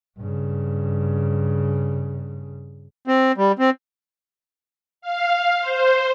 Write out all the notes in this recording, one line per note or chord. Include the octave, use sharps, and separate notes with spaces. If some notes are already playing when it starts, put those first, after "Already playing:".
G2 C#3
C4
G3
C4
F5
C5